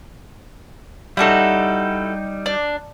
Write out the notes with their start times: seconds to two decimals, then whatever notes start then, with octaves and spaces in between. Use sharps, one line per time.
1.17 G3 D#4 E4 F#4 A4
2.46 D4